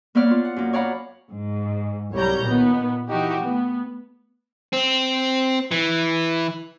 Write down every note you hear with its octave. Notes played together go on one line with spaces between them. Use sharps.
A#3 B3 C#5 D5 F6
B3 F4
F#5
F#2 A#3
C#5 D5 F5 F#5 A#5 B5
G#2
C2 F#3 G3 C#5 A#5 G6
A#2 D#3 B3
E3 D#4 F#4 G4
A3 B3
C4
E3